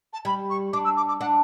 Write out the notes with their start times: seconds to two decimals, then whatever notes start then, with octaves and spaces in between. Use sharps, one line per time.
0.13 A5
0.25 G3 B5
0.50 C#6
0.73 D4 D6
0.85 E6
0.97 D6
1.08 D6
1.21 D4 F#5